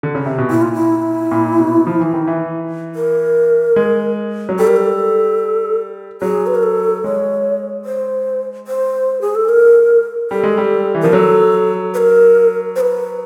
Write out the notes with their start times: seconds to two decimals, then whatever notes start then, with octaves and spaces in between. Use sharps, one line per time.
0.03 D3
0.15 C#3
0.26 C3
0.38 B2
0.49 A#2 E4
0.62 F4
0.74 E4
1.31 A#2
1.59 B2
1.87 F3
2.00 E3
2.13 D#3
2.27 E3
2.95 A#4
3.76 G#3
4.49 F#3
4.59 G3 A4
4.67 A#4
4.76 A4
6.22 F#3 G#4
6.47 B4
6.55 A#4
6.63 A4
7.04 G#3 C#5
7.85 C5
8.67 C5
9.21 G#4
9.35 A4
9.49 A#4
10.30 G3 A4
10.43 G#3
10.58 G3
10.95 E3
11.02 F3 A#4
11.12 F#3 A4
11.94 B4
11.97 A#4
12.76 C5
12.80 B4